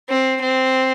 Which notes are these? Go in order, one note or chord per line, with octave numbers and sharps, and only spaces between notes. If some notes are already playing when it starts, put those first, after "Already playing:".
C4
C4